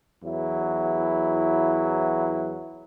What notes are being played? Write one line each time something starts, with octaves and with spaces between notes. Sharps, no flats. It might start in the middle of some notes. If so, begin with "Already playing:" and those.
E2 F#3 E4